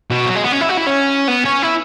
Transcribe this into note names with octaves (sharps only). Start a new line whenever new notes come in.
B2
F#3
G#3
B3
C#4
E4
F#4
E4
C#4
B3
C#4
E4